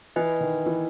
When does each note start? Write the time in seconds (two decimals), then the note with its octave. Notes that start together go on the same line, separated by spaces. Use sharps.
0.16 E3 E4 B4 D#5 G#5
0.41 D#3
0.66 E3